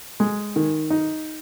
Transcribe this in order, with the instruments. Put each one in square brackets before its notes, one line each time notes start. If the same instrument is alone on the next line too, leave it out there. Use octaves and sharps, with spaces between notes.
[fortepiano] G#3
D#3
D#4